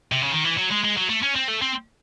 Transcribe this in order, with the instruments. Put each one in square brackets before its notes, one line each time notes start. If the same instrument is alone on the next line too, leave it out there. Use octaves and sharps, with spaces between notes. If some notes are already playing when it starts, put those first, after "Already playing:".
[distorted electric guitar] C3
C#3
D#3
E3
F#3
G#3
G#3
F#3
A3
C#4
C4
A3
C4